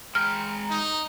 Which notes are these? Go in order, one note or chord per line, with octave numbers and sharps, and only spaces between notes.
G#3 G5 A#5 F6
D#4